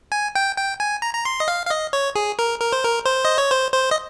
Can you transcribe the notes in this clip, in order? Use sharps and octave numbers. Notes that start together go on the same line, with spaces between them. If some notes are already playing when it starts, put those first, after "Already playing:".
G#5
G5
G5
G#5
A#5
A#5
C6
D#5
F5
F5
D#5
C#5
G#4
A#4
A#4
C5
A#4
C5
D#5
C#5
C5
C5
D#5